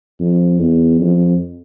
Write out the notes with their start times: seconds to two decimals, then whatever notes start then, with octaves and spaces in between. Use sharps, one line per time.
0.20 F2
0.59 E2
1.00 F2